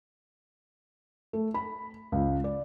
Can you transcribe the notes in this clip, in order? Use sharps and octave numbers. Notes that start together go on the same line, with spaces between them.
A3
B5
C#2
D5